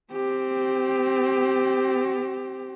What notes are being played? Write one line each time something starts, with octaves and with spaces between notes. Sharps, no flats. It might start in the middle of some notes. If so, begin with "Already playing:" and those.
C4 G4